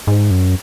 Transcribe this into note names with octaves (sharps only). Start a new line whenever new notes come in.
G#2
F#2